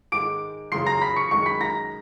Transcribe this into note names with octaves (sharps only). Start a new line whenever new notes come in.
G#2 D#3 G#3 D6 D7
F#2 C#3 E3 C6 C7
A#5 A#6
B5 B6
C#6 C#7
F#2 D#3 G#3 C#6 C#7
B5 B6
A#5 A#6